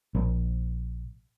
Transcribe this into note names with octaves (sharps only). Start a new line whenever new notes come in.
A#1